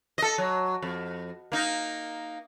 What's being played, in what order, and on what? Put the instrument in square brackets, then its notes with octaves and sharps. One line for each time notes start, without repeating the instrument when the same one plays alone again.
[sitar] A4 D#5
F#3
F2
A#3 D#4